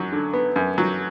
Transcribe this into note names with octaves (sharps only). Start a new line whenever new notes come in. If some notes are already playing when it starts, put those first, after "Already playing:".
Already playing: F#2 F#3
D3
B3
F#2
F#3